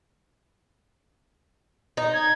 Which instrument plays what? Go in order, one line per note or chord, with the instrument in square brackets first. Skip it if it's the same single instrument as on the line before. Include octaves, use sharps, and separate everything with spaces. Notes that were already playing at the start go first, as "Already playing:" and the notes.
[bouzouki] D#4
[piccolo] G#6